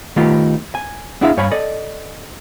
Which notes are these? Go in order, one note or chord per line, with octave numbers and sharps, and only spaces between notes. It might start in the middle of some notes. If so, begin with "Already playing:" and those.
D#3 A3 B3 D#4 F4 G4
G#5
B3 D4 E4 G#4 E5 F5
G2 C#5 F5 G#5 B5
A4 D5 D#5